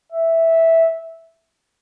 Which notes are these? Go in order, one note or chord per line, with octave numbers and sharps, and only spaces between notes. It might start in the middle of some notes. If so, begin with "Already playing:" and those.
E5